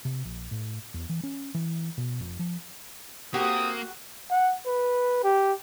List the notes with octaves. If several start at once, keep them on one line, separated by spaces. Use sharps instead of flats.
C3
A#1
A2
E2
E3
C#4
E3
B2
F1
F3
A#3 C4 F#4 G4 A#4 D#6
F#5
B4
G4